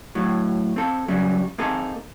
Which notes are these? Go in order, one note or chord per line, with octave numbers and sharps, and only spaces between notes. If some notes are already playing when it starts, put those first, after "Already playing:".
A2 F#3
C4 A4
F#2 C#3 F#3 G3
A#3 C4 D#4 G#4 A4